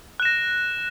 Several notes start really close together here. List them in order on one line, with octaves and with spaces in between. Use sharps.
F#6 E7 A#6